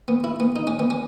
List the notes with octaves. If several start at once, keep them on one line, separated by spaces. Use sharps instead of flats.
B3
E4
B3
D#4
C#4
B3
C#4